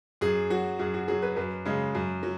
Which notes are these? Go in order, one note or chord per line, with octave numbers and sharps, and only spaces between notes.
F#2 G#4
F#3 F#4
F#2 G#4
F#4
F#3 G#4
B4
F#2 B4
C#3 G#3
F#2
F#3